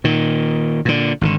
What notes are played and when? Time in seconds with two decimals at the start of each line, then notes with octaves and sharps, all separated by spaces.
0.04 A#2 D#3
0.85 A#2 D3
1.21 G#1 B2 D3